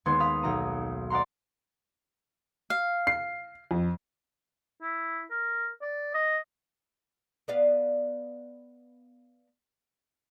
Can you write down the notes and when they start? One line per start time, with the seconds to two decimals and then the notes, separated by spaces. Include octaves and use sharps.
0.06 D#2 G#3 B3 C6 G#6 C7
0.20 F5 B5 D#6
0.43 B1 A#5 D#7
1.10 D5 F5 F#5 A#5 C6
2.70 F5
3.07 C7
3.71 F2
4.82 E4
5.30 A#4
5.82 D5
6.14 D#5
7.48 B3 D5 F5